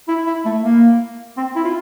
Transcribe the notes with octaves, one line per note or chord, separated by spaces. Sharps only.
E4
E4
A3
A#3
C4
E4
F4